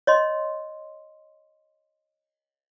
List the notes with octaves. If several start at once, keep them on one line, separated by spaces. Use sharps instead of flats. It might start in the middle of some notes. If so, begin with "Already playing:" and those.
C#5 D#5 C6